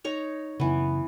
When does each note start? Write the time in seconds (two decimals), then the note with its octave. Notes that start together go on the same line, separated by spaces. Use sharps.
0.04 D#4 C#5 A#5
0.60 F#2 C#3 E3 B3